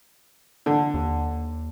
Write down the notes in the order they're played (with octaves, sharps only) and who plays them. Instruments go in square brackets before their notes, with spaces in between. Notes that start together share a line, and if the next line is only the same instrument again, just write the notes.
[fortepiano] D3
[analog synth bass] D#2